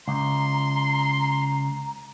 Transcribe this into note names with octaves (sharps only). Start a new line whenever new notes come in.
C#2 A#5 C6